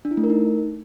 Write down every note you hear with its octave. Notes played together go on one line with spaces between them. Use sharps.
D4
E4
A3
A#4
D#4